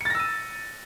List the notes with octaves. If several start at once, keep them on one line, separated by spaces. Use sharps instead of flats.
E6 A6 A#6 C#7 D#7